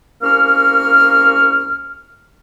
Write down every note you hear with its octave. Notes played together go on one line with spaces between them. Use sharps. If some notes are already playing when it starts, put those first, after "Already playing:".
C2 A#3 C#4 C#6 F6